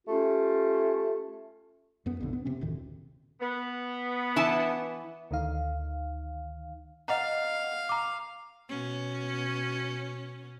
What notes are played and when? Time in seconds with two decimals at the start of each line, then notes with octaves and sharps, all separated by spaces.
0.07 A3 C#4 F4 G4
2.06 F#2 B3
2.20 A#1 F2 D3
2.33 B3
2.45 C3 C4 C#4
2.61 F1 D2 A2 D#3
3.40 B3
4.36 E3 A5
5.31 D2 D#3 D#4 F5
7.08 D#5 F5 F#5 A#5
7.89 A#5 D6
8.69 B2 C#4